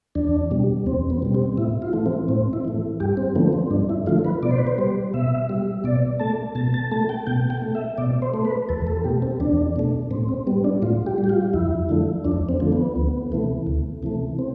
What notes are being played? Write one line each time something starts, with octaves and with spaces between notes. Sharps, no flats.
E2 D4
B2 G3
E2 C4
B3
B2 G3
C4
A2 E4
F4
E3 A3
C4
A2 C4
E4
E3 A3
G2 G4
C4
D3 F3 A3 B3
C4
G2 D4
E4
D3 F3 A3 F4
B4
B2 D5
C5
B4
C5
G3
B2 E5
G3
B2 D5
A3 A5
B2 A5
A5
A3 A5
G5
B2 G5
G5
A3
E5
B2 D5
C5
A3
B4
E2 A4
A4
B2 A3 G4
C4
E2 D4
B2 A3
A2 C4
C4
G3 B3
D4
A2 F4
G4
G3
G4
F4
F2 E4
D3 F3 A3
F2 D4
C4
D3 F3 A3
B3
D2
C3 E3 A3
D2
C3 E3 A3
C4